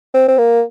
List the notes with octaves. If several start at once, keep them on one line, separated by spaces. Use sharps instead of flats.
C4
C4
A#3